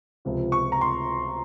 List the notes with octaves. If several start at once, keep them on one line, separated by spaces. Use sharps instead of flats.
C#2 C3 F3 C4
C#6
A#5
C6